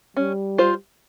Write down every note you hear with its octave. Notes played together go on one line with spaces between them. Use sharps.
G3 C#4
F4 C5